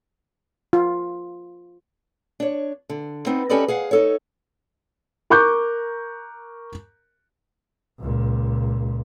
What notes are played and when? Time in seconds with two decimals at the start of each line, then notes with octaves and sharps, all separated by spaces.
0.73 F4
2.40 D4 C#5
2.89 D3
3.26 B3 C4 D#4
3.49 C#4 G4 A4 B4 D5 D#5
3.68 G#4 F5 F#5
3.91 D#4 A4 C#5
5.30 A#4 A#5 C#6 D6 F#6 G6
8.01 C#2 A#2